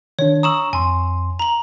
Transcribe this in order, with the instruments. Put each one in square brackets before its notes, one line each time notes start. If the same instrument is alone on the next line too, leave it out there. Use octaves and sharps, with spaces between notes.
[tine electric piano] D#3 D4 [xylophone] C#5
[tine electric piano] A#5 C#6 E6 [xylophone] D#6 E7 F#7
[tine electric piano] F2 C6 [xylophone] G#5
[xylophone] A#5 F#7